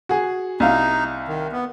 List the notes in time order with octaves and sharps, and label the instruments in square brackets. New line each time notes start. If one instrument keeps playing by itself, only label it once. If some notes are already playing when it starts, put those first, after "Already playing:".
[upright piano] F#4 G#4
[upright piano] C2 F5 [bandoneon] D#4
[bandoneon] D#3
B3